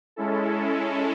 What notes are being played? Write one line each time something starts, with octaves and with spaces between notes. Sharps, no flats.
G#3 C#4 E4 A4